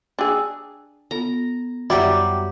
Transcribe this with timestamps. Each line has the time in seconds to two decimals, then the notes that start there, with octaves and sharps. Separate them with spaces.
0.19 D4 G#4 G5 D6 E6
1.11 B3 F4 A4 A#5
1.90 F#2 F#3 G3 E4 D5 F#5 G5 A#5